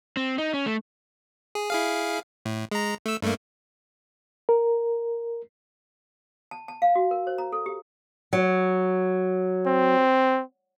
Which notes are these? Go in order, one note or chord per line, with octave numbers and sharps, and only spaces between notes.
C4
D#4
C#4
A3
G#4
E4 G#4 F5
A2
G#3 A#5
A3 E6
G2 A3 A#3
A#4
A5
A5
F5
F#4
A#4
C5
A#5
A4
G4
F#3
C4